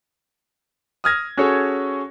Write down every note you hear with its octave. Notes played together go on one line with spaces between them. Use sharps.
D#6 F6 G#6 A#6
C#4 F#4 G#4 A4 C#5